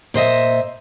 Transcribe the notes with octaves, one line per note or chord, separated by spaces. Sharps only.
A#2 C5 D#5 E5